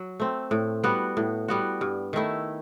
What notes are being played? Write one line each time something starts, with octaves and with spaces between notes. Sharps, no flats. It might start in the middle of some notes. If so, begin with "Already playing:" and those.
Already playing: F#3
A3 C4
A2
G3 B3 F#4
A2
G3 B3 F#4
G2
D#3 A3 E4